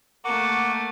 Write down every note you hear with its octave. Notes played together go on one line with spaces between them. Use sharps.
A3 A#3 F#5 C#6 D6